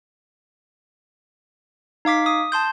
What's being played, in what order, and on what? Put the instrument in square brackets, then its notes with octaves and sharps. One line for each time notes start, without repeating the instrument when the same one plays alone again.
[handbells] D#4 F5 D6 B6
D#6
A5 C6 G6